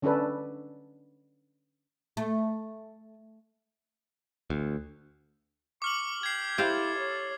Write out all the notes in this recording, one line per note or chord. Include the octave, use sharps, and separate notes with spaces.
D3 C#4 D4 A4 B4
A3
D2
C#6 D6 F6 F#7
G4 G#6 C7
E4 G4 A4 C5 F5
C#5